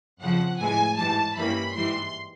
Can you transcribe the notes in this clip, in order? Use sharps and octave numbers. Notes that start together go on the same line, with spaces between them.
F2 C#3 F3 F#5
A2 E3 G#3 G#5
G#2 E3 G3 A5
G2 E3 G3 A#3 C#4 B5
G#2 E3 G3 C6